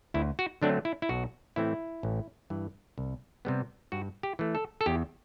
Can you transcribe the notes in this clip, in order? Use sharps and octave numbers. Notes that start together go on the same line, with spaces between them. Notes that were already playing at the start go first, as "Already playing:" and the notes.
D2 E4
F#4
D3 F#3 A3 C4 D4
E4
E4
B1 F#4
A2 E3 A3 C4 E4
A1
G2 E3
C2
C3 G3 B3
G2 F#4
G4
E3 A3
A4
A4
E2 G4